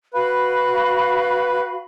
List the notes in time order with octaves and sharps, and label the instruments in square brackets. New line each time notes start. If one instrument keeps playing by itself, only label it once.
[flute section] F#4 F5 B5 [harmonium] B4